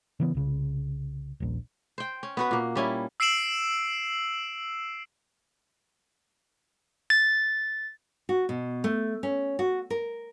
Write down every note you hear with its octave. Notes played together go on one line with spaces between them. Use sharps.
C#3 E3 B3
C2 C#3
D#1 A#1
C5 G5
C#4
B3 F#4 B4
A#2 A#3
G3 C#4 E4
E6 C7 D7 E7 F#7
A6
F#4
B2
A3
C#4
F#4
A#4